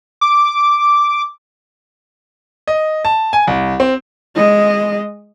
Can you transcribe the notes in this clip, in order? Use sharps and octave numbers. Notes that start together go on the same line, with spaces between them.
D6
D#5
A5
G#5
C2
C4
G#3 D#5